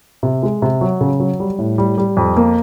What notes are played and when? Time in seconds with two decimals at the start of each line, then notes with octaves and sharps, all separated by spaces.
0.23 C3
0.43 G#3
0.62 C3
0.81 F#3
1.01 C#3
1.20 F#3
1.40 G3
1.59 A2
1.78 G3
1.98 G3
2.17 F2
2.37 A#3